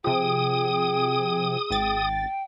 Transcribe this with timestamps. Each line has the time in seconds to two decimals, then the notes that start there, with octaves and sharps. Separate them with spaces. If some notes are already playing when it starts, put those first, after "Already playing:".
0.04 C3 F3 G#4 G5 D#6
1.70 G#1 G5 A6